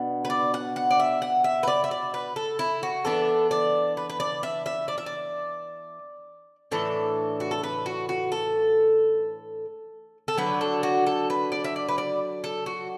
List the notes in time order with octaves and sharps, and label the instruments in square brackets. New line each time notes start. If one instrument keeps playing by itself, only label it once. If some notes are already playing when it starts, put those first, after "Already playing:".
Already playing: [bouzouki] B2 B3 D4
B4
D5
F#5
F#5
D5
E5
F#5
E5
B4
D5
E5
D5
B4
A4
E4
F#4
E3 B3 D4 A4
D5
B4
B4
D5
E5
E5
D5
E5
D5
A2 E3 D4 A4
F#4
A4
B4
F#4
F#4
A4
A4
D3 F#3 D4 B4
A4
F#4
A4
B4
D5
E5
D5
B4
D5
A4
F#4